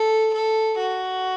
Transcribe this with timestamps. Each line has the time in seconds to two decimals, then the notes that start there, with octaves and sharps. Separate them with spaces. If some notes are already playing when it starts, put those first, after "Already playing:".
Already playing: A4
0.34 A4
0.78 F#4